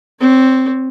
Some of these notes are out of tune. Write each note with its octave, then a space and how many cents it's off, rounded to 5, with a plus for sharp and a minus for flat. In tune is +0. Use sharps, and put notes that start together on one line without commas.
C4 +0 C#5 +30